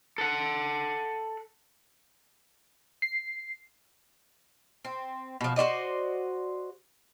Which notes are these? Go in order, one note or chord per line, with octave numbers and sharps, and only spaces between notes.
A4 F#5
C7
C4
B2 F3
F#4 C5 D5 D#5